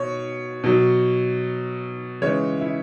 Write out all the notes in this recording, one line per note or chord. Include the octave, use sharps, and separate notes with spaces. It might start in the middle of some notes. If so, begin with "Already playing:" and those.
Already playing: B2 C#5
B2 F#3
C#3 E3 G#3 C#5
E4